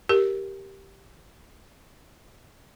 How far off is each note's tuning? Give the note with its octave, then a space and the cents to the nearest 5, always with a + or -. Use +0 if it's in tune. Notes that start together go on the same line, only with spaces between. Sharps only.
G4 -5 A#4 +0